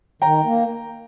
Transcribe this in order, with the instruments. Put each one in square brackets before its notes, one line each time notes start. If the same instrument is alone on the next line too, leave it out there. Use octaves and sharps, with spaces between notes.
[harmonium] D#3 [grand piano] G5 A#5
[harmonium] A#3